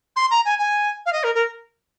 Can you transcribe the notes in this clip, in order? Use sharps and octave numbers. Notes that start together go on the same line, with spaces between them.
C6
A#5
G#5
G#5
F5
D#5
A#4
A#4